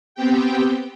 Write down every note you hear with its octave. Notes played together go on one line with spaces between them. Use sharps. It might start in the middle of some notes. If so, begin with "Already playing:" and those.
B3 C4 G4 G5